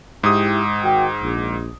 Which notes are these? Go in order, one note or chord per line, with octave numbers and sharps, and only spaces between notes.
G#2 E4 G4 D#6
D#3 F#4 G5
A#1